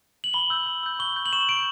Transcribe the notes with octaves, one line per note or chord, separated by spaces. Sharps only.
F#7
B5 G7
E6 G6
B5
E6 G6
C#6 G7
G6
F#7
C#6 E7
G6 D7